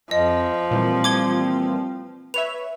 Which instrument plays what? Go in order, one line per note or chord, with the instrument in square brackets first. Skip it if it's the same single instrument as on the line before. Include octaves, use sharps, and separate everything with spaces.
[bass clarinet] F2 [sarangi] F3 [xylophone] D#5
[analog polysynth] A#2 E3 G3 [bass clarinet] C4
[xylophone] D6 G#6 G7
[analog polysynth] B4 C#5 E5 [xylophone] F7